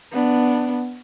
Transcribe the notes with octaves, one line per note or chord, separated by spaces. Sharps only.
B3 D4